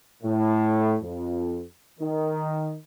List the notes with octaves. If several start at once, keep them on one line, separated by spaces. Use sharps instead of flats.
A2
F2
D#3